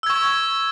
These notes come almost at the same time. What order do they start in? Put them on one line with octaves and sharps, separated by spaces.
E6 G#6 C#6